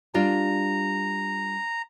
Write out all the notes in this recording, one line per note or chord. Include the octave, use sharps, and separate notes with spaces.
G3 D4 F4 A#5